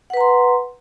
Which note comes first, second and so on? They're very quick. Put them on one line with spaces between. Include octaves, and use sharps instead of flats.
F#5 B4 A#5 C6